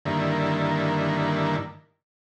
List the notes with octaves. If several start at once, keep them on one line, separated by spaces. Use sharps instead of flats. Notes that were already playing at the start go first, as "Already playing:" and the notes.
G2 D3 D#3 A#3 E4